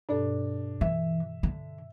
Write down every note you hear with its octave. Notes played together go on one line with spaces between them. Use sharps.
G2 B2 D4 A4
E3 E5
D3